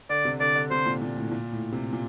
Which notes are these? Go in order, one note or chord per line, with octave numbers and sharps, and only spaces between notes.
D3 D5
C3
D3 D5
D3
C3 C5
A#2
A#2
A2
A#2
A2
C3
A#2